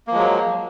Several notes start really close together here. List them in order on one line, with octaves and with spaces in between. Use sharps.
A#3 F3 G#3 F#3